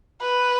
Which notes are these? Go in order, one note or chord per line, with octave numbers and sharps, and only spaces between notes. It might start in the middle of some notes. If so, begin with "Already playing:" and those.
B4